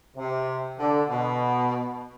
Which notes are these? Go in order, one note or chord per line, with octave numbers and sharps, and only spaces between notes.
C3
D3
B2